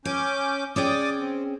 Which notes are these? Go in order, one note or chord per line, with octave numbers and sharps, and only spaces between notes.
C#4 G#5 D6 G6
C#4 G#4 D5 G5 D6 D#6
C4